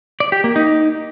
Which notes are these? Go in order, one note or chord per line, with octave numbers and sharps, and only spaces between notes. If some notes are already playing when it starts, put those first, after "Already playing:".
D5
G4
A#3
D#4